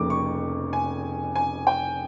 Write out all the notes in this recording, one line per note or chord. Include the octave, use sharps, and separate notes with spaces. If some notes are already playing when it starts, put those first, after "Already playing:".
Already playing: F1 F2 C#3 A#3 D6
C#6
G#5
G#5
G5